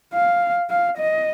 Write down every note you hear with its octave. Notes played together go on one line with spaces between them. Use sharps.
F5
F5
D#5